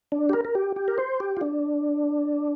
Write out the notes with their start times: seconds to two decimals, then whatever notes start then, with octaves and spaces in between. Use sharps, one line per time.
0.12 D4
0.29 G4
0.33 A#4
0.45 A#4
0.55 G4
0.76 G4
0.88 A#4
0.98 C5
1.20 G4
1.37 F4
1.41 D4